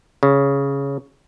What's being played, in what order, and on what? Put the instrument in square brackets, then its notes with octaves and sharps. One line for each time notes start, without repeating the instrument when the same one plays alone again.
[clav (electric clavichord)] C#3